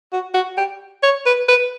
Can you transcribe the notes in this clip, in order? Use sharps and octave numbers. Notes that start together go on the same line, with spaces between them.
F#4
F#4
G4
C#5
B4
B4